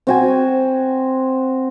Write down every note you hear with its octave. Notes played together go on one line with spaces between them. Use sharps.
C4 F#4 G#5